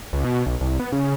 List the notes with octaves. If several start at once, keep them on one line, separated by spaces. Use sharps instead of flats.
C#2
B2
B1
C2
B3
C#3